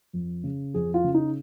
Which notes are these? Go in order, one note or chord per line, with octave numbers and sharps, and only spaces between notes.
F2
C#3
F2 G#4
F4
C#3
D#4